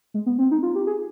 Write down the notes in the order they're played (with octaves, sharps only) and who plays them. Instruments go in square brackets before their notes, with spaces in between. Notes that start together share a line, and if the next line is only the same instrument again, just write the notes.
[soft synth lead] G#3
B3
C4
D#4
F4
G4
G#4